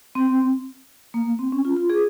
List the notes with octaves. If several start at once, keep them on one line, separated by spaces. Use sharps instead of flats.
C4
A#3
C4
C#4
F4
F4
G#4